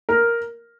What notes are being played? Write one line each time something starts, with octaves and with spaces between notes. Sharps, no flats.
A#4